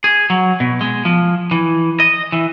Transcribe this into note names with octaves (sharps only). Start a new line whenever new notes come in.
G#4
F#3
B2
G#3
F3
E3
D#5
E3